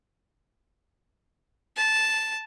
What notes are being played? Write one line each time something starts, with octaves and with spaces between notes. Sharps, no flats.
A5